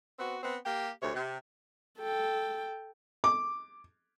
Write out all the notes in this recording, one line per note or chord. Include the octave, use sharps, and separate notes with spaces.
B3 C4 F#4
B3 C4
A#3 G4
D2 C3 C#5
C3
A4 G5
D6